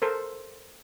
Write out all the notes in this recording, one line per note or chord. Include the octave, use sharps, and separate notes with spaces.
A4 A#4 C5